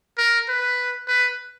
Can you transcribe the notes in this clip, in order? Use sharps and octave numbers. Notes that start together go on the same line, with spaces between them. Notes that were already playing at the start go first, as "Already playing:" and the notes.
A#4
B4
B4